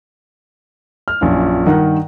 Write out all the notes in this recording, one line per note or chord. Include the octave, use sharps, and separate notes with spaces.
F6
A#1 F#2 C#4 E4 F4
G2 D#3 A#4 F#5